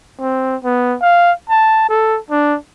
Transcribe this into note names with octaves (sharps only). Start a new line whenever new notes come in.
C4
B3
F5
A5
A4
D4